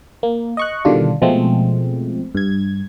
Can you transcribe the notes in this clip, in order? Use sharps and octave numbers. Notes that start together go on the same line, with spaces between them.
A#3
D#5 C#6 F#6
B2 D3 D#3 G3 D4 F4
B2 F3 G#3 A3 C4
G2 G#6